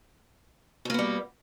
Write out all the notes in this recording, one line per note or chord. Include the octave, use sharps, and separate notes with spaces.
B2 G3 A#3 B3